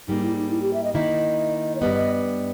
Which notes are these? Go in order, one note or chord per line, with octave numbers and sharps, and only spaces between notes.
G#2 G3 A#3 D#4
E4
D#4
E4
G4
E5
D#5
D#3 A#3 E4 D#5
C#5
G2 G3 B3 D#5
D#5